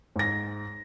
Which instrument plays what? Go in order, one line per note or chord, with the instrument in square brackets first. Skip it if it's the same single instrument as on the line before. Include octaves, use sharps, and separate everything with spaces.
[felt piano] G#2 A#6